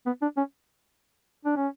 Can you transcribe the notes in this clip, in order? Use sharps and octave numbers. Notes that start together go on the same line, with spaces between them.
B3
D4
C#4
D4
C#4